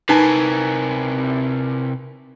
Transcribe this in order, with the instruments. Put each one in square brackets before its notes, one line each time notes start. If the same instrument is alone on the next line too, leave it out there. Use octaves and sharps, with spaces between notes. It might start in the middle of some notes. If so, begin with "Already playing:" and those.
[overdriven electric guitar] C3 A#4 [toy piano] D#4 [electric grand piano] B4 G#5 A5